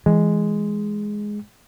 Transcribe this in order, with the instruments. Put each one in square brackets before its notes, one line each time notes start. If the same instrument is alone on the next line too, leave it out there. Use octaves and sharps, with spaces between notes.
[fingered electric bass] E3 [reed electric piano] G#3